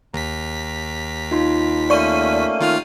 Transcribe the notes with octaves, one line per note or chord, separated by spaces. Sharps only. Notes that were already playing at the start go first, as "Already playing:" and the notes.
D#2 A#5 B6
D#4 F4 C6
A3 A#3 C#4 D5 C#6 D#7
D#3 F4 F6